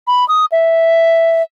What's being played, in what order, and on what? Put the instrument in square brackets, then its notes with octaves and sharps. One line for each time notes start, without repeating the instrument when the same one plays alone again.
[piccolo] B5
D#6
E5